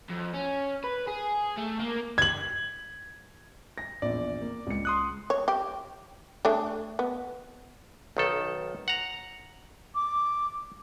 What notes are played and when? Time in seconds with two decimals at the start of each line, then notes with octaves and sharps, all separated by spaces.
0.09 F2
0.34 C#4
0.84 B4
1.08 G#4
1.57 A3
1.80 A#3
2.18 G#6 F#7
3.78 A#6
4.02 A#1 E2 D5
4.41 A#3
4.67 C#2 C#7
4.85 C6 D#6 F#6
5.30 C#5
5.48 G4
6.45 A3 D4 G#4
6.99 B3
8.17 B1 D#3 A4
8.88 F#5 A#5
9.95 D6